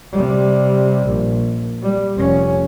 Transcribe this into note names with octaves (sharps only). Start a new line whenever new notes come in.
C3 G3
A#1
G3
F1 C#4